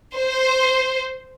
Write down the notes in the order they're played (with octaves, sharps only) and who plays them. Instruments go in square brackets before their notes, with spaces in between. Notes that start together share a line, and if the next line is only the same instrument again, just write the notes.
[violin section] C5